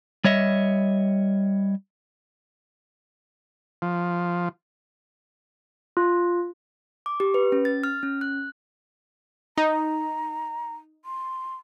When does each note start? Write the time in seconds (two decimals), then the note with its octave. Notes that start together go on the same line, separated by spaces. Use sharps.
0.24 G3 C#5 D#5 E5
3.82 F3
5.97 F4
7.06 D6
7.20 G4
7.34 B4
7.52 C#4
7.65 A6
7.84 F6
8.03 C#4
8.21 F#6
9.58 D#4 A#5
11.05 C6